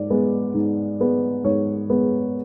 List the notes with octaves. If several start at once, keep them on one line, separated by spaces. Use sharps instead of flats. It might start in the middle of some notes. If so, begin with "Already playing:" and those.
Already playing: G#2 D5
G#3 B3
G#2
G#3 B3
G#2 C#5
G#3 B3